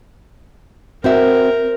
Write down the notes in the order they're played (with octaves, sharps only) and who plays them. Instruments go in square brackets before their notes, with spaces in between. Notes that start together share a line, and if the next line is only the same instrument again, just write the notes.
[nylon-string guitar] C4 F#4 E5 [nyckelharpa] A#4